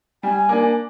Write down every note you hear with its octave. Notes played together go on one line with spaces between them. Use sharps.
G3 G#5
A#3 D4